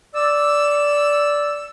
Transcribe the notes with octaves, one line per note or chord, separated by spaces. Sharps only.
D5 E6